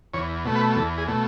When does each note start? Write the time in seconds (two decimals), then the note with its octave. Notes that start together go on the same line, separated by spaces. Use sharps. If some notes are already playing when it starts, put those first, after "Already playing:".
0.14 E2 C#5
0.45 B2 A3
0.55 B4
0.76 E2 A4
0.98 G#4
1.08 B2 A3